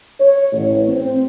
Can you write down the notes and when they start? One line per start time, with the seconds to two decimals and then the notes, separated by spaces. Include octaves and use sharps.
0.20 C#5
0.52 A1
0.88 C4